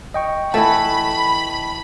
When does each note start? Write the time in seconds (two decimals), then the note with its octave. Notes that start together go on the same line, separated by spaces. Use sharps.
0.14 D#5 G5 C#6
0.54 E3 A3 A5 B5